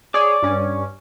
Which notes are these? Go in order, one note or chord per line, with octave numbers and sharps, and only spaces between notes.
G#4 C#5 D5
G2 C#4